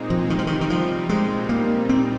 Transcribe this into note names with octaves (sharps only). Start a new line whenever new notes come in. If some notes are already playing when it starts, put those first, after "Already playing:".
Already playing: A#2 G#3 C4 D#4
F3
C3 D#3 G3 C4 D#4
F3
D#3
D#3
F3
A#2 G3 G#3 C4 D#4
A#3
C4